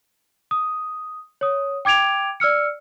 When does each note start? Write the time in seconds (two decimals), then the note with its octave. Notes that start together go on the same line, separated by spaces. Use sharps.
0.51 D#6
1.41 C#5 D#6
1.85 G5 D6 G#6 D7 F7
2.40 D5 E6 F6 C#7